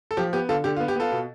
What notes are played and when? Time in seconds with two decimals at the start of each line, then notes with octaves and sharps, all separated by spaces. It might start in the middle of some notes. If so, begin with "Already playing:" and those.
0.11 A4
0.17 F3 G4
0.33 B3 G4
0.49 D3 F4 A4
0.64 D3 G4
0.76 F4
0.80 B3
0.88 G4
0.96 B3 F4 A4
1.12 B2